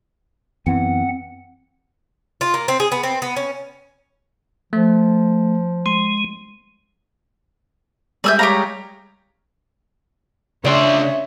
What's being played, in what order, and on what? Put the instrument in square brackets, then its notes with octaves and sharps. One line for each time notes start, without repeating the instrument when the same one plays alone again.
[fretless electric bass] F#2 E3 B3 [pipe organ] C4 F#5
[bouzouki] F4
A#3
C4
G#4
B3
C4
B3
C#4
[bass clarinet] F3 [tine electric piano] A3
[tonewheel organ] G#3 [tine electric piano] C6
[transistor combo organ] G3 G#3 [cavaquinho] D5 E5 [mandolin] G#5 E6 G6
[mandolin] G4 C#5 F5 [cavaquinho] A#5
[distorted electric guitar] C#3 C6 [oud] D4 D5 [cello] C#5 E5